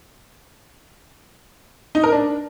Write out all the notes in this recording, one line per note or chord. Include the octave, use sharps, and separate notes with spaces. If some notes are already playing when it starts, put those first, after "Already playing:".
D#4
A#4
D4